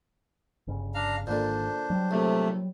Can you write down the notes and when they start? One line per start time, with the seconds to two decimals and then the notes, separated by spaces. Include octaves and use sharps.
0.67 G1 C#3
0.94 D4 F5 A#5
1.27 G#1 A#2 D3 A#3 D4 C5
1.90 F#3 G3
2.11 A#1 C3 A3